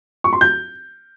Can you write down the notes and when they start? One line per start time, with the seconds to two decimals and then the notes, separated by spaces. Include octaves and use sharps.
0.24 C#6
0.33 C6
0.41 G6